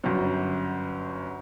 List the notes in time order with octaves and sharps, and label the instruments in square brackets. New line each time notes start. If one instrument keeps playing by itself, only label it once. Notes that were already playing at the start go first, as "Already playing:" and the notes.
[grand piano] G1 F#2